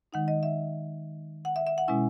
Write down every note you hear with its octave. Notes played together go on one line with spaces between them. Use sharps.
D#3 G#3 D#4 F#5
D#5
E5
F#5
E5
E5
F#5
B2 G#3 C#4 E4 G#5